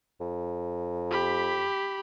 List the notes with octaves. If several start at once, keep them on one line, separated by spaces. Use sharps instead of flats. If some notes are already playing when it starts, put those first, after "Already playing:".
F2
G4 B5